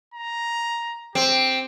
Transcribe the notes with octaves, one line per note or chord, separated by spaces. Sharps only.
A#5
C4 G4